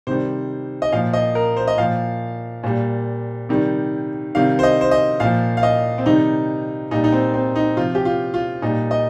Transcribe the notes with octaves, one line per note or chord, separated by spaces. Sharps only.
C3 D#3 G3 C5
D#5
A#2 F3 F5
D#5
A#4
C5
D#5
A#2 F3 F5
A#2 G3
C3 D#3 G3
C3 D#3 G3 F5
C5
D#5
C5
D#5
A#2 F3 F5
F5
D#5
C4
C3 D#3 G3 D#4
A#2 G3 D#4
D#4
C4
C4
D#4
C3 F3 F4
G4
F4
F4
A#2 G3 D#4
D#5